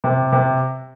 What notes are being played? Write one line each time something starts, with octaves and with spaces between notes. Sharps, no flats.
C3
C3